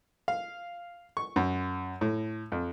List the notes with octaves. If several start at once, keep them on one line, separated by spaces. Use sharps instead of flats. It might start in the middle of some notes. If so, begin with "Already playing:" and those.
F5
C#6
F#2
A2
F2